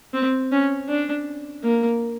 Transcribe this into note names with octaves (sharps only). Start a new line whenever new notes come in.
C4
C#4
D4
A#3